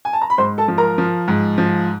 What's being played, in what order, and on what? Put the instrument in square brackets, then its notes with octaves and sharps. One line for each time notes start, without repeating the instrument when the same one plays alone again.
[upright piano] G#5
A5
A#5
B5
G#2 C5 C6
A4 A5
F3
A#4 A#5
F3
G#2
F3